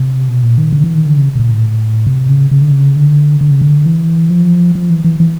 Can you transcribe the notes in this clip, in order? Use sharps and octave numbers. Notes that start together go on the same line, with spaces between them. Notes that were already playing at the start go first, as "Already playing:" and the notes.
Already playing: C3
B2
A#2
D#3
D3
E3
D#3
D3
C#3
B2
A#2
A2
C3
C#3
C#3
D3
C#3
D3
D3
C#3
D3
E3
F3
F3
E3
E3
E3